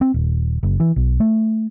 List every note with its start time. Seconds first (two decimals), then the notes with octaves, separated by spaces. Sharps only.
0.01 C4
0.14 D#1
0.63 F#1
0.80 E3
0.96 B1
1.20 A3